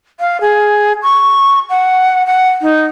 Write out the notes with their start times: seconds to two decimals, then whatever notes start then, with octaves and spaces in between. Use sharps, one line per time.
0.20 F5
0.41 G#4
1.03 C#6
1.70 F#5
2.26 F#5
2.62 D#4